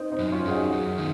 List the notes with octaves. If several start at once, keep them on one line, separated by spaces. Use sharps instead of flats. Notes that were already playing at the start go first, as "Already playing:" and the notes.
Already playing: C4 D#4
C4 D#4
F#2
C#4 F4
F#2 G#4
D#4 F#4
F#2
D#3